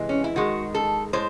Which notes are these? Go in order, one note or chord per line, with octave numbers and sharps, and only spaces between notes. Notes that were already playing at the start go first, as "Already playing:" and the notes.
Already playing: C3 E3 G#3
C#4
E4
D#3 G#3 F#4
A4
A2 G#3 C5